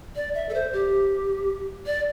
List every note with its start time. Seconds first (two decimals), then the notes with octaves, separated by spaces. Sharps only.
0.16 D5
0.34 E5
0.49 A4
0.54 C5
0.73 G4
1.86 D5